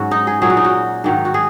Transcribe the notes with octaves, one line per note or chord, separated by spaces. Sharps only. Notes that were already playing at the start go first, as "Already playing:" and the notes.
Already playing: G#2 F#3 C#4 F#4
D#4
G#4
A#2 F#3 G#4
F#4
D#4
F#4
G#2 D#3 F#3
F#4
G#4